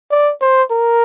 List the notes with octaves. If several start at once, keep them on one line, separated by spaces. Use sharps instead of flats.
D5
C5
A#4